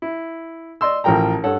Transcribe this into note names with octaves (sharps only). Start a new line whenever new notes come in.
E4
D5 D#5 C6 E6
A1 F3 A#4 G5 A#5
G2 A4 C#5 F#5